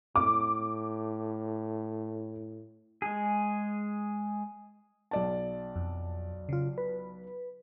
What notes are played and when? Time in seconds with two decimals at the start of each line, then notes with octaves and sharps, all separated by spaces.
0.16 A2 D6
3.02 G#3 G#4
5.11 B1 D5 A5
5.76 F2
6.49 C#3 F4
6.78 B4